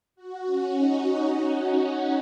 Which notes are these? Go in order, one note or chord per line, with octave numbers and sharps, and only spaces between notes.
F#4
C#4
D#4